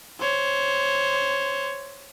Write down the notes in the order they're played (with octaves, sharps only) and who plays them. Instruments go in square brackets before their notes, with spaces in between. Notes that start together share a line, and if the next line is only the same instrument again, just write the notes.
[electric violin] C5 C#5